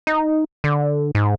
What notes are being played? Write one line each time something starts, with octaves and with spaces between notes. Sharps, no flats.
D#4
D3
G#2